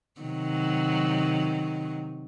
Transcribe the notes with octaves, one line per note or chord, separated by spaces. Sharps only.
C3 D#3 F#3